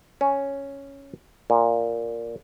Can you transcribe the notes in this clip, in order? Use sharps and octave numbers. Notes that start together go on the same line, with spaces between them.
C#4
A#2